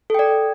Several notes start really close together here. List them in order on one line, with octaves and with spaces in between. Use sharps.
A4 G5 D5